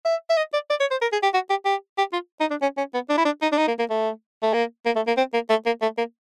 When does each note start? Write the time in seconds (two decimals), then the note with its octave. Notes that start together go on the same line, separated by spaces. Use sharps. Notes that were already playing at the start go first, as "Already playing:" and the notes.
0.05 E5
0.30 E5
0.37 D#5
0.54 D5
0.70 D5
0.81 C#5
0.91 C5
1.02 A#4
1.12 G#4
1.23 G4
1.34 F#4
1.50 G4
1.65 G4
1.98 G4
2.13 F4
2.40 D#4
2.51 D4
2.62 C#4
2.78 C#4
2.94 B3
3.09 D4
3.18 E4
3.25 D4
3.42 D#4
3.52 D4
3.58 D#4
3.68 A#3
3.79 A#3
3.90 A3
4.43 A3
4.54 A#3
4.86 A#3
4.96 A3
5.07 A#3
5.17 C4
5.34 A#3
5.50 A3
5.66 A#3
5.82 A3
5.98 A#3